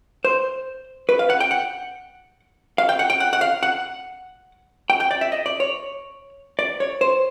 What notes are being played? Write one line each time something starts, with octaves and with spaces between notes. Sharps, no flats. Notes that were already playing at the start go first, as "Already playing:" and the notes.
C5
B4
F5
F#5
G5
F#5
F5
G5
F#5
G5
F#5
F#5
F5
F#5
G5
G5
D5
E5
D#5
D5
C#5
D5
C#5
C5